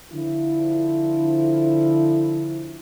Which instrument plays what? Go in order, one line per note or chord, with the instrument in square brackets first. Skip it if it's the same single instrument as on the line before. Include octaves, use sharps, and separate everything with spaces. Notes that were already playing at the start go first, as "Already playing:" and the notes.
[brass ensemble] D3 F3 E4